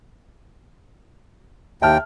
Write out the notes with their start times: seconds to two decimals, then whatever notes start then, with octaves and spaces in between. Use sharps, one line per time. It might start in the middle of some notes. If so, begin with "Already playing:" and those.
1.82 D#2 E5 G5 A5 F6